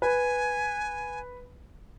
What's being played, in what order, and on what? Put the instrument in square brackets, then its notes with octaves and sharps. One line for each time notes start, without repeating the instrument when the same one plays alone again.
[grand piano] B4 [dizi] G#5